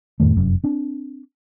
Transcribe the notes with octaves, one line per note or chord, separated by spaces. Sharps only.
F2 A2 D#3 A3
F1 F#2
C4 D4